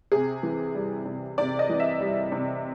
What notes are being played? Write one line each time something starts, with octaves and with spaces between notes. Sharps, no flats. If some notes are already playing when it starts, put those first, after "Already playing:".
C3 G#4
E3
G3
C3
C3 D5
D#5
E3
E5
G3
C3